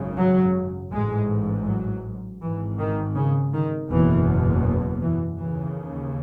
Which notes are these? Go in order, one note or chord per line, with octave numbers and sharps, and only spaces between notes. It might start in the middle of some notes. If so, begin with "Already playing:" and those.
Already playing: G#1 F#2 C#3
F#3
A1 G#2 G#3
F#3
G#1 G#2 E3
D#3
C#3
D#3
F#1 E2 B2 E3
E3
D#2 C#3 E3